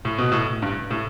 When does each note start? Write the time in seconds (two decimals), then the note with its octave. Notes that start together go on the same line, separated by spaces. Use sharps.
0.05 A2
0.18 B2
0.32 A2
0.62 G2
0.91 A2